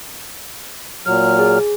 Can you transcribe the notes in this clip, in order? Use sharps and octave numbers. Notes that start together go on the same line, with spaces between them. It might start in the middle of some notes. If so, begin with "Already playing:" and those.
A#2 F#3 F6
G#4